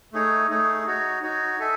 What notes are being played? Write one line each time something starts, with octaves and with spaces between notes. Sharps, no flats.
A3 D#4 G#4 C#5
A3 D#4 G#4 C#5
D#4 F#4 C#5
D#4 F#4 C#5
D#4 A4 E5 G#5